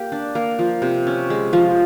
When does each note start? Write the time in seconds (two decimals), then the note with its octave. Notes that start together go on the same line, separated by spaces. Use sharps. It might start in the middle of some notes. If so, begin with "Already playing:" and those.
Already playing: A#3 G4
0.12 D4
0.35 A#3
0.59 F3
0.82 C3
1.07 C#4
1.30 G#3
1.53 F3